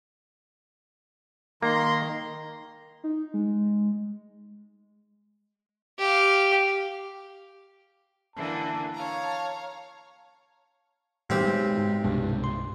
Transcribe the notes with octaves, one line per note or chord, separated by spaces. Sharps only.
D#3 A#3 A#5 C6
D#4
G#3
G4 F5
D3 E3 A#3 A5
C#5 F5 A#5
B1 A2 G3 C4 G4
G#3
G#2
C2 G2 B2 G3 G#3
C6